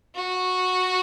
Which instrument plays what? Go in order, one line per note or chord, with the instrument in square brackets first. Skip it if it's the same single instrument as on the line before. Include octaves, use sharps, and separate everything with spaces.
[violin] F#4